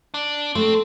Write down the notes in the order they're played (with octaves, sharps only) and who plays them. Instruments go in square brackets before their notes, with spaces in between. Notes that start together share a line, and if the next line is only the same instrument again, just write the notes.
[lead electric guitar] D4
[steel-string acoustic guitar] A3 [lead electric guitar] C4